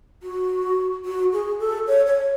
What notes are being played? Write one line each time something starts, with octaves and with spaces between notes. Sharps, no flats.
F#4
F#4
G#4
A4
C#5
C#5